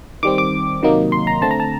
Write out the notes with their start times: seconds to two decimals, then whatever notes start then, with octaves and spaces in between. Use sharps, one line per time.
0.23 D#3 G3 C4 D6
0.38 D6
0.83 C3 D#3 F#3 A#3 D#4
1.12 C6
1.27 A#5
1.42 D3 A3 C4 A5
1.51 A#5
1.60 A5